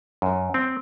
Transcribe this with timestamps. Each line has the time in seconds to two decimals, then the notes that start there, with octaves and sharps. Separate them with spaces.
0.22 F#2
0.54 C4